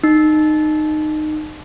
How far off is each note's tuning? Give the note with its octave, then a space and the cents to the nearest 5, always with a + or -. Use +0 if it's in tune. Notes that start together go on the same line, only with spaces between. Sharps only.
D#4 -20